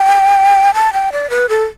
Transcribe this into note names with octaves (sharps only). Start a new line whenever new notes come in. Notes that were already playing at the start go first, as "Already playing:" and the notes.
Already playing: G5
A5
G5
D5
B4
A4